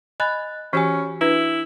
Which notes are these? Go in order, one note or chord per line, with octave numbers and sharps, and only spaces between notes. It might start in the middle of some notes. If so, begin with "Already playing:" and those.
D#5 G#5 B5 F#6 A6
E3 C#4 F#4 G4 G#5
D4 E4 B4